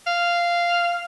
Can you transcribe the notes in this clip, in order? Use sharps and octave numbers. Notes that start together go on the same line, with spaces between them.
F5